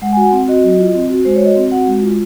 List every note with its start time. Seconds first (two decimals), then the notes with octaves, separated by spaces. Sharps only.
0.02 G#3 F#5
0.13 G#5
0.17 F#4
0.22 F#5
0.32 C4
0.48 F#4 D#5
0.63 F#3
0.79 F4
0.95 C4
1.10 F#4
1.25 G#3 C5
1.36 C#5
1.40 F#4
1.45 D#5
1.56 C4
1.71 F#4 F#5
1.87 G#3
2.02 F4